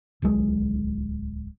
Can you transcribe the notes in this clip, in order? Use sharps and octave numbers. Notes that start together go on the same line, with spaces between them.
D1 C2 F#3 G#3